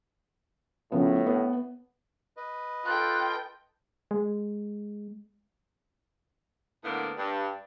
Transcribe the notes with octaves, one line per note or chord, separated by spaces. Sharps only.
A2 C#3 F3 B3
B3
B4 D#5
F4 A4 G5 F#6
G#3
A2 D3 A#3 B3
G2